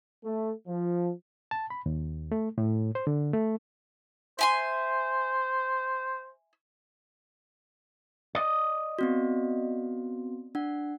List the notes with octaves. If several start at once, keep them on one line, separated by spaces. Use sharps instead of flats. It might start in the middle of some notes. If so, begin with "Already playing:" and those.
A3
F3
A5
B5
D#2
A3
A2
C5
D3
A3
C5 E5 G#5 C6
D5 D#5
B3 C4 F#4
D4 F#5